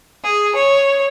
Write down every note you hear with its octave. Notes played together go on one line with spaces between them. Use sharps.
G#4
C#5